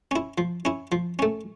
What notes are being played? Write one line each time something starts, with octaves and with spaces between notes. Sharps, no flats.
C#4 E4
F3
C#4 E4
F3
A3 C#4